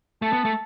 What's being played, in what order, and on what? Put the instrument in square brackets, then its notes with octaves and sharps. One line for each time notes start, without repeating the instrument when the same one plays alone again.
[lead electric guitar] A3 [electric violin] A5
[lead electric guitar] B3
A3